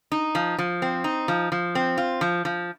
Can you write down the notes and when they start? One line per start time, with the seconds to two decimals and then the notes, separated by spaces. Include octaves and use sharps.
0.12 D#4
0.35 F3
0.58 F3
0.82 C4
1.04 D#4
1.28 F3
1.52 F3
1.75 C4
1.98 F4
2.21 F3
2.45 F3